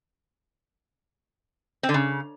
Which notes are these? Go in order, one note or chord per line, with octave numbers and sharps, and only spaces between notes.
C4
D3
C#3